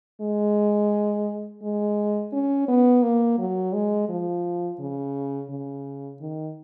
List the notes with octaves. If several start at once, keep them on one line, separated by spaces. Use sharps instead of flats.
G#3
G#3
C#4
B3
A#3
F#3
G#3
F3
C#3
C#3
D#3